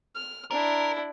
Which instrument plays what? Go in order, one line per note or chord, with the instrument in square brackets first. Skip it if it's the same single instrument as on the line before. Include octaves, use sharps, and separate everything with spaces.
[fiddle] F6
[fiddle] D4 E4 [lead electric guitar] A#4